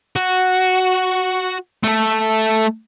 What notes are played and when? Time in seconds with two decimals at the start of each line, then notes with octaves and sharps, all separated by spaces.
0.16 F#4
1.83 A3 A4